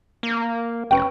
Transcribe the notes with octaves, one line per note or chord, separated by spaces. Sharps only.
A#3
F1 C#4 B4 G5